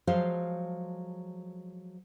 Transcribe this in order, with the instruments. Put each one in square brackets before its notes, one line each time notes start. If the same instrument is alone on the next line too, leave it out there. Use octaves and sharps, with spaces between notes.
[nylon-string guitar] F3 F#3 G#3 A4 C5 F5